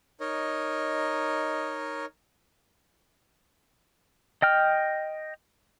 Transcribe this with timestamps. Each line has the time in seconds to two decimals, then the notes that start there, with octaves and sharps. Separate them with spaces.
0.20 D#4 A#4 C#5 D#5
4.42 D#5 G5 F6